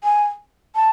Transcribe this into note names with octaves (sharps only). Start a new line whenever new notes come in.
G#5
A5